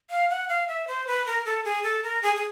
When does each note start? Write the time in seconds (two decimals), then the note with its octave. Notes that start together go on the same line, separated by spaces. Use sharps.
0.10 F5
0.30 F#5
0.49 F5
0.68 E5
0.87 C5
1.07 B4
1.26 A#4
1.46 A4
1.65 G#4
1.84 A4
2.03 A#4
2.23 G#4
2.36 G#4